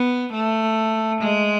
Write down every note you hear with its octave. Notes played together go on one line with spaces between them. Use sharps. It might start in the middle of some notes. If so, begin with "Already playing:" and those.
Already playing: B3
A3
G#3